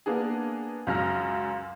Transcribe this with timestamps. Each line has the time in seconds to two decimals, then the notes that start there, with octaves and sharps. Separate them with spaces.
0.06 A#3 B3 D4 G#4
0.87 C#2 F#2 F6 A#6